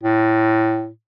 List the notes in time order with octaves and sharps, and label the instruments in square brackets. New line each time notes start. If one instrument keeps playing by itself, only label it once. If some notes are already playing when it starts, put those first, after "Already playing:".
[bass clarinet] A2